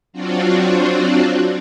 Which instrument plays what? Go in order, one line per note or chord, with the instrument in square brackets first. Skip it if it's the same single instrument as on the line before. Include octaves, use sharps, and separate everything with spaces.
[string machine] F#3 C4 D4 F4 F#4